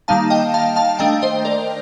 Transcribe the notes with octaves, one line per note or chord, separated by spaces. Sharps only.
D#3 G3 A#3 D#4 F5 A5
D#5 G5
F5 A5
F5 A5
D#3 A3 D4 D#5 G5
C5 D#5
A#4 D5